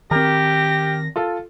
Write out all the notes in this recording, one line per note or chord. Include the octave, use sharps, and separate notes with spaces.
D#3 C4 G4 A#4 A#6
F4 A4